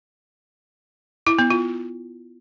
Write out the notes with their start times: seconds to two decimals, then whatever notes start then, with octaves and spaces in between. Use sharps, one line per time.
1.27 E4
1.39 B3
1.50 F4